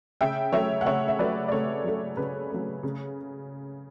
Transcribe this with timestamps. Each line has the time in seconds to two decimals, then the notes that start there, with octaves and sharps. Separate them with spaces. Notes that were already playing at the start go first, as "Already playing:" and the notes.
0.21 C#3 E5 G5
0.52 F#3 A3 C#5 E5
0.81 F#5
0.86 C#3 C#5 E5
1.08 E5
1.19 F#3 A3 B4 D5
1.48 D5
1.51 C#3 A4 C#5
1.84 F#3 A3
2.17 C#3 B4
2.50 F#3 A3
2.83 C#3